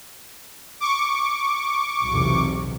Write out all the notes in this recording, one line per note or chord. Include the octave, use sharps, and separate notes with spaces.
C#6 D6
B1 E2 C3